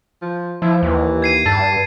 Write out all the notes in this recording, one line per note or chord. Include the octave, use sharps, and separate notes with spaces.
F3
F3 E4
D#2 E3
G#6 C7 D#7
G2 A5